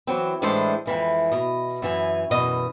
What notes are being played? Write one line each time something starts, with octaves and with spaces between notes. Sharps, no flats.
E3 F#3 C4
A2 E3 G#3 D4 A4 C5
F2 E3 G#3
B2 D#5
F#2 E3 G#5
F#2 B2 E3 D#5